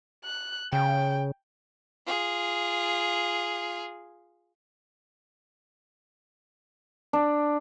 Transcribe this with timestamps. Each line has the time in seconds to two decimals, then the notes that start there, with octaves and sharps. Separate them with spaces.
0.24 F#6
0.73 C#3 G5
2.06 F4 G#4
7.13 D4